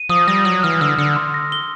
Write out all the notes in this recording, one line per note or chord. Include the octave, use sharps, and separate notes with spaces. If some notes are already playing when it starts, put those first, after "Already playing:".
Already playing: D#7
F3 D#6
G3 A#6
F#3 F#7
E3 F6
D3 E6
D3 C#7
C6
A#6
G7